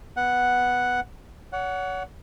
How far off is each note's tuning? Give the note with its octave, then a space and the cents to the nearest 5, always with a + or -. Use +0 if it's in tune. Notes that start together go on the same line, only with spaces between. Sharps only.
B3 +0 F#5 +0
C#5 +35 F#5 +0